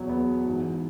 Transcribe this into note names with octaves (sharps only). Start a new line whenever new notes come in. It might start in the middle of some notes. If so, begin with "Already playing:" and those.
Already playing: E2 B2 F#3
B3
G#2 E3